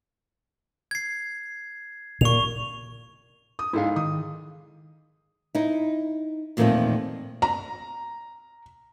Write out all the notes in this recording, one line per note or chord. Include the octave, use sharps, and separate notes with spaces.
G#6 C7
A#2 C#6 F7
D#6
G#2 E4 A4 F5
D#3 D#6
D#4 E4
E2 A#2 D#3 F3 A3 C4
A#5